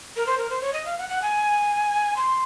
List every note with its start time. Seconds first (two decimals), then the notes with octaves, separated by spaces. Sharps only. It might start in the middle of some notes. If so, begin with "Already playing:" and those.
0.16 A#4
0.26 C5
0.38 A#4
0.50 C5
0.61 C#5
0.73 D#5
0.85 F5
0.98 F#5
1.09 F#5
1.22 G#5
2.17 C6